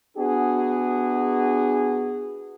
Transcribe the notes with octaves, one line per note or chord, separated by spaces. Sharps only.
B3 D4 F#4 G#4